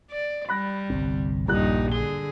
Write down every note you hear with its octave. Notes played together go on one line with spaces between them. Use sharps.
D5
G3 B5 F#6 A#6
G1 C2 C4
D#1 A#1 G2 D#4 F#6
D3 G#4 G7